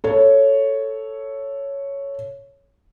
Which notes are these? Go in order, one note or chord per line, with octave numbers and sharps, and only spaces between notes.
A4 C#5